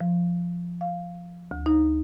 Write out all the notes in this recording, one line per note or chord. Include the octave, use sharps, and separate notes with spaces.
F3
F5
D2
D#4